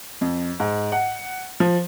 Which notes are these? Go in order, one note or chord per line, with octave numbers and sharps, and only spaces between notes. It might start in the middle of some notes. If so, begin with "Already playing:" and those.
F2
G#2
F#5
F3